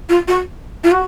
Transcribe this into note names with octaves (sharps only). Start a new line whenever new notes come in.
F4
F#4
F4
F#4